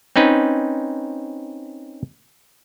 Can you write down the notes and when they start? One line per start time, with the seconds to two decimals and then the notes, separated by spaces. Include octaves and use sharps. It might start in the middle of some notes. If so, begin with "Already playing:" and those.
0.16 C4 C#4 D#4 B4